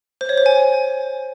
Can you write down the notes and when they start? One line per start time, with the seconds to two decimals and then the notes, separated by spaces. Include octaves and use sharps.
0.21 C5
0.29 C#5
0.38 C5
0.46 G#5